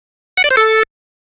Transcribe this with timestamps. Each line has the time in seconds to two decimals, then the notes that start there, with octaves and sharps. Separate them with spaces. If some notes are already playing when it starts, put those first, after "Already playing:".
0.38 F#5
0.44 D5
0.51 C5
0.57 A4